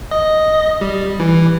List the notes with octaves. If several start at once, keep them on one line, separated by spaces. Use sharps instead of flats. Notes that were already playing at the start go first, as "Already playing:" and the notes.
D#5
G3
E3